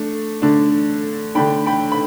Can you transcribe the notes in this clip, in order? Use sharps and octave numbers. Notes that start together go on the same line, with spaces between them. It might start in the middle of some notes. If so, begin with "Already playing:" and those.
Already playing: A3 D4
D3 A3 D4
D3 A3 D4 G5 B5
G5 B5
B5